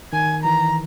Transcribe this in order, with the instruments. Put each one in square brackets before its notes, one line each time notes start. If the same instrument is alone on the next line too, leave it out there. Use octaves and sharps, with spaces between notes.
[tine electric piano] D#3 [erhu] G#5
[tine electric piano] E3 [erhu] A#5